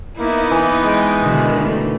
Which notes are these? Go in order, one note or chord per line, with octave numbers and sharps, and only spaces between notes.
A#3 B3 D#4 E4
E3
G#3 G5
B2 D3 D#3
A3